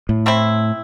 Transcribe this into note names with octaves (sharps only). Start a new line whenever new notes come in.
A2
A3 C4 E4